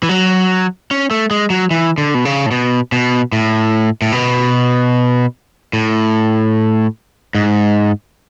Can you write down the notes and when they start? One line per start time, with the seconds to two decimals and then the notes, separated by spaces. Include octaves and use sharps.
0.03 E3
0.09 F#3
0.91 C#4
1.11 A3
1.31 G#3
1.50 F#3
1.71 E3
1.98 D3
2.14 B2
2.25 C#3
2.46 A2
2.51 B2
2.92 B2
3.32 A2
4.02 A2
4.12 B2
5.73 A2
7.35 G#2